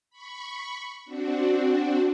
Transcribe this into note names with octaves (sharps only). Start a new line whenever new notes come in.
B5 C#6
C4 D4 F#4